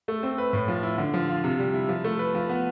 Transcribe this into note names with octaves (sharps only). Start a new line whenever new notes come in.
A3
C4
B4
A2
F3
E4
D3
F3
F4
C3
G3
E4
F3
A3
B4
F3
B3